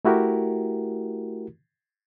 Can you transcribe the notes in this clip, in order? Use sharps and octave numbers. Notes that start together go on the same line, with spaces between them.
A3 E4 F#4 G4 A#4